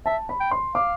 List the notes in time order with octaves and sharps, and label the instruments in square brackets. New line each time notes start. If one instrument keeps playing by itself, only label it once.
[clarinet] E5 [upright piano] A5
[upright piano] B5
[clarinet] G5
[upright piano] C6
[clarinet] F5 [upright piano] D6